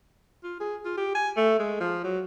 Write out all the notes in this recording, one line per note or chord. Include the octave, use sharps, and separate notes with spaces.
F4
G#4
F4
G4
G#5
A3
G#3
F3
F#3